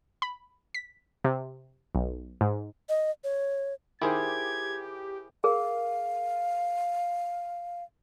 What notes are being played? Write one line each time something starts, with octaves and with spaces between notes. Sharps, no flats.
B5
B6
C3
B1
G#2
D#5
C#5
D#3 E4 G4 G#4 C5 G#6
G#4 A#4 F5